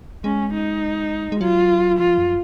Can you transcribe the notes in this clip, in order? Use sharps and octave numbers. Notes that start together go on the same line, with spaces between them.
G#3 C#4
D#4
G#3
F#3 F4
F3 F4
F#2